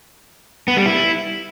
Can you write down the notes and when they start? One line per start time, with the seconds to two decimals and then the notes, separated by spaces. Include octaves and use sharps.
0.68 B3
0.77 G3
0.86 E4